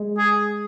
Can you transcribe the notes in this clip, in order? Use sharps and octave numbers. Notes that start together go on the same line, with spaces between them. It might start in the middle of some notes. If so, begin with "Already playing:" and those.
Already playing: G#3
G#4